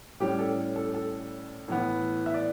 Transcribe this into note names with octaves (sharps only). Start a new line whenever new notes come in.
A2 G3 C#4 G4
A4
A4
A4
A2 E3 B3
E5
D5